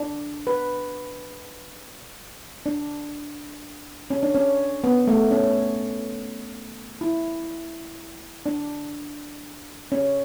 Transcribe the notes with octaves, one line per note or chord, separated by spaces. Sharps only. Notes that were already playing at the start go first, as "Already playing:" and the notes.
Already playing: D4
B4
D4
C#4
D4
C#4
B3
A3
C#4
E4
D4
C#4